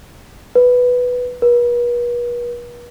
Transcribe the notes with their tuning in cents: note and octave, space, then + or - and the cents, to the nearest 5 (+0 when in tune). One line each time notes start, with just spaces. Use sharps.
B4 +0
B4 -45